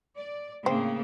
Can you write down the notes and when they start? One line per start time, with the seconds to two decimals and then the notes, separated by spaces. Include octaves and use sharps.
0.17 D5
0.66 A2 C#3 A#3 C4